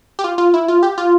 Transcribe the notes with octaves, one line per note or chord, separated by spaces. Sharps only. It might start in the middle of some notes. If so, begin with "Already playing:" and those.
G4
F4
F4
E4
F4
G4
F4